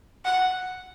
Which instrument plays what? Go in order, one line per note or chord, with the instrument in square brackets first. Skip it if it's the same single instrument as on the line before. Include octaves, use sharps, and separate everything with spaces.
[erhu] F#5